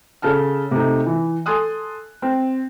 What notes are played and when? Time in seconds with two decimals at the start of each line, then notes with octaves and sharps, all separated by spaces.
0.22 C#3 A4 A5 F6
0.71 C3 A3 D#4
1.06 E3
1.46 A4 G#5 C6 D#6 F#6
2.22 C4